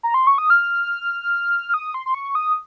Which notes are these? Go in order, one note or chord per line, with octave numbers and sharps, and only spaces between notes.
A#5
C6
C#6
D#6
F6
F6
D#6
C6
C6
C#6
D#6